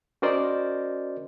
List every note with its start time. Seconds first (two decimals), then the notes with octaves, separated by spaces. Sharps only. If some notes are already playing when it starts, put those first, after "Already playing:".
0.22 C#4 F#4 A#4 C5 D5 D#5